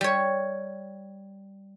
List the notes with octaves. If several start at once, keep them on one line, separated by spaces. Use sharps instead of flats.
G3 C#5